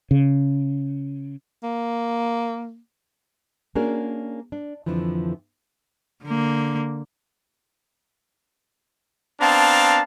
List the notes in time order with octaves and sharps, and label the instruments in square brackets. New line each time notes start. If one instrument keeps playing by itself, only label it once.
[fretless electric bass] C#3
[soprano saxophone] A#3
[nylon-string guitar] A#3 C#4 D4 F#4 G#4 A#4
D4
F2 D3 E3 F3
[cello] D3 A#3
[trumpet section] B3 C4 D4 F5 A5 A#5